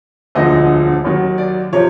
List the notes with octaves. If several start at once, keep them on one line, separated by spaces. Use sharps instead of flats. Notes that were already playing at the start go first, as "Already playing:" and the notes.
E1 D2 D3 F3 D#5
D#2 D#3 F#3
D5
C3 F3 C#5